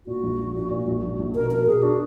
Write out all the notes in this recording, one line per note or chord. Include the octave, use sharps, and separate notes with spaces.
A#2 F#4
A#1
A#1
A#2
A#2
A#1
A#1
A#1
B2 A#4
B2 A#4
B2 G#4
D4 F#4